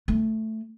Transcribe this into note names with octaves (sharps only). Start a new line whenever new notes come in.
A3